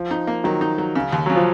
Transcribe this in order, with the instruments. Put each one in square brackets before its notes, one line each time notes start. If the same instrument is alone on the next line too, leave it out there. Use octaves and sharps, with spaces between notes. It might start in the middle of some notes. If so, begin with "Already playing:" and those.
Already playing: [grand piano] F3
[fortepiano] D#4
A#3
[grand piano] D#3 [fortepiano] F#3
[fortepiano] D#4
F#3
C#3
D#2
[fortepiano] C#3 [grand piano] F#3
[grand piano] F3